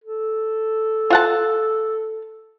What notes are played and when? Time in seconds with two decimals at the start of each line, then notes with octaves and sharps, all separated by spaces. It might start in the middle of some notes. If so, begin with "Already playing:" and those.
0.04 A4
1.10 F4 F#5 A5